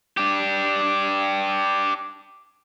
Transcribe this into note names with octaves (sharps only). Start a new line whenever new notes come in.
D4 G4